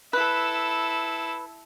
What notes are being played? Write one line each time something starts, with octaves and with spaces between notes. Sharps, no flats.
E4 A4 B4